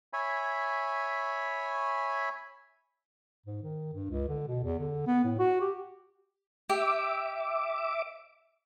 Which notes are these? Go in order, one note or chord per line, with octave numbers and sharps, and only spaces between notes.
C#5 E5 G#5 B5
G#2
D#3
G2
C#2
D3
B2
E2
D3
B3
A2
F#4
G4
G4 E5 D6